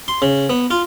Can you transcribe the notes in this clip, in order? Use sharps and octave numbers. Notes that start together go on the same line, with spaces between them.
C6
C#3
B3
F4